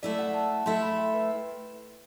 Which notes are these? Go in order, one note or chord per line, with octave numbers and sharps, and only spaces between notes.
A3 E4 A4 D5 E5
F#5
A5
A3 E4 A4 E5 C6
B5
G5
B4